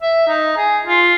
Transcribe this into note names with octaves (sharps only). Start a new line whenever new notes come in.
E5
D#4
G#4
F4